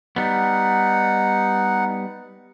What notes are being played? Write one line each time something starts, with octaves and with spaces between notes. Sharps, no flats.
G3 B3 D#4 F#5